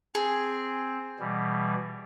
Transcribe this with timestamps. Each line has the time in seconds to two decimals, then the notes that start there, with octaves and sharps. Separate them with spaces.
0.15 C4 G#4
1.19 B2 E3 G3